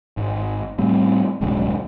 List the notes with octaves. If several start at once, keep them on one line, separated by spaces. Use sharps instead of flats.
G#1
A2 G3 C4
D1 B1 F#2 G#3